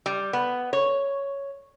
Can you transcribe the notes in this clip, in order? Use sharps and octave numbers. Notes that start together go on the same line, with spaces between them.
G3
B3
C#5